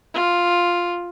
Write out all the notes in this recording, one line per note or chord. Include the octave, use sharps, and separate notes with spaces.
F4